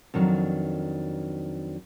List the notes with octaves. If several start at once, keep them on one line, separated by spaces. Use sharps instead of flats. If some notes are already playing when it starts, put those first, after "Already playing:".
F2 D#3 F#3 D4